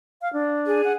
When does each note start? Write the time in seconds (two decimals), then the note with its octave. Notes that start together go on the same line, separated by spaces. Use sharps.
0.22 F5
0.33 D4
0.66 G#4
0.84 F#5